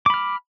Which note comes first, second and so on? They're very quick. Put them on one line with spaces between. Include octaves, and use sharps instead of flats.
D6 B5 F6